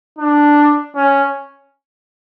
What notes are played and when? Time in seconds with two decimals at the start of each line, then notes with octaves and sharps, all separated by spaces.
0.19 D4
0.95 C#4